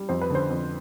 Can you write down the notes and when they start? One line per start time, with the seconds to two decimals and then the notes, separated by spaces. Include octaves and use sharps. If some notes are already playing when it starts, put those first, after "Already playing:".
Already playing: G3
0.09 F2 C5
0.21 B4
0.30 D3 C5
0.50 F2